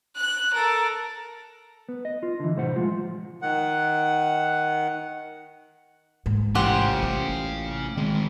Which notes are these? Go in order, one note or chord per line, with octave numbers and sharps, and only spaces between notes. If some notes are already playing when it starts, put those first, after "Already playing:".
F#6
A4 A#4
B3
D#5
F4
D3 E3
C2 A2 C5 F#5
F3 G#3 F4
D#3 F#5
G#2
A1 A#2 G4 C5 F5 F#5 G#5
C#4
D#3 G#3 C4